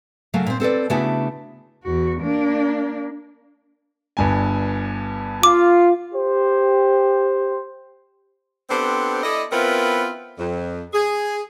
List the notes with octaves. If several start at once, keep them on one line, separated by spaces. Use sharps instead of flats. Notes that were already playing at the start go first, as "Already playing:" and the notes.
C#3 F#3 A3 A#3
A#2 C4
C4 A4 B4 D5
C#3 A3 B3 D4 E4 F#4
E2 F#4
A#3 D4
G1 G2 G#5
F4 D6
G4 C5
B3 C4 D4 G4 A4 C5
E4 A4 D5 D#5
B3 C4 E4 F4 A#4 B4
F2
G#4